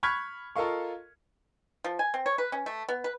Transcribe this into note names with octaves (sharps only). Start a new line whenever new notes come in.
B5 C#6 F6 F#6 G#6 B6
F4 A4 A#4 D#5 F5 C#6
F3
G#5
C4
C#5
B4
C#4
A3
B3
B4